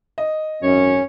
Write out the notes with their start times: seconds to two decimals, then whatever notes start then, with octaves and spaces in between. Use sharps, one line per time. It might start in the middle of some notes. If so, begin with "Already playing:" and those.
0.18 D#5
0.63 G#1 F#2 C#4 C#5